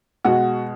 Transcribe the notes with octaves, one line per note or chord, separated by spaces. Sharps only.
B2 G#3 F#4